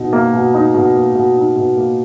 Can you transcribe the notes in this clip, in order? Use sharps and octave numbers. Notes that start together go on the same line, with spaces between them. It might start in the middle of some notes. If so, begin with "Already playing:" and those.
Already playing: B2 D#4
A#3
B2
D#4
B2
A#3
B2
D#4
B2
A#3